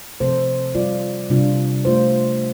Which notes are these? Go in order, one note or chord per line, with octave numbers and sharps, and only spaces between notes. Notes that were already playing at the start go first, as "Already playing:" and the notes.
C3 F3 C4 A4 C5
G3 F4 D5
C3 G3 D4 F4
A3 F4 C5